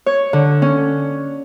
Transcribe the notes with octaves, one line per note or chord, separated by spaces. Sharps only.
C#5
D3
C#4